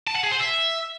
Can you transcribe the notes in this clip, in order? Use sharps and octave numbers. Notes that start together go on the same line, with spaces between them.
A5
F#5
G#4
C5
E5